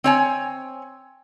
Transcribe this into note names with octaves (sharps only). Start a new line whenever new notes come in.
C4 C#5 G#5